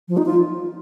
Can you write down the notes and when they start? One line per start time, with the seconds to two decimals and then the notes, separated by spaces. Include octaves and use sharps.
0.08 F3
0.17 D#4
0.26 F4